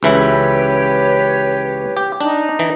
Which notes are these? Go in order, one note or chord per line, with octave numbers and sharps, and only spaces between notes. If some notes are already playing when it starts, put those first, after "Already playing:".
C#2 E3 E4 G4 B4 C#5
G4
D4 D#4
E3